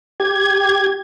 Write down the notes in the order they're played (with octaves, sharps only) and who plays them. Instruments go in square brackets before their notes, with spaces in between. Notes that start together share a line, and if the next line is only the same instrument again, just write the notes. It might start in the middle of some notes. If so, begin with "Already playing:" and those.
[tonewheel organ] G4 G#6